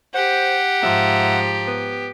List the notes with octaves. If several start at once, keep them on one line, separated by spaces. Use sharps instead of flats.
G4 C5 F#5
G#2 F3 E5 A#5
B3